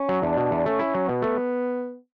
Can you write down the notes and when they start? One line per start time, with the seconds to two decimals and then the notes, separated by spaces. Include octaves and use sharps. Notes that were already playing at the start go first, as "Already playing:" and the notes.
Already playing: C#4
0.09 F#3
0.22 E2 D4
0.37 B2
0.51 E2
0.65 A3 C#4
0.79 E4
0.94 F#3
1.08 B2 B3
1.22 A3